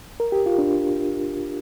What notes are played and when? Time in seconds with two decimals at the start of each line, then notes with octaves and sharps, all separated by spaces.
0.20 A#4
0.32 G4
0.46 F4
0.58 D4